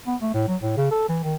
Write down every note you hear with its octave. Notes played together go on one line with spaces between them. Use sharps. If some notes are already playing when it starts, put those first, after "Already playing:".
B3
A3
A2
F#3
A2
C#3
A4
E3
D#3